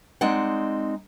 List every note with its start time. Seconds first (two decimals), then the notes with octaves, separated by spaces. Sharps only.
0.21 G#3 C4 D#4 D5 F#5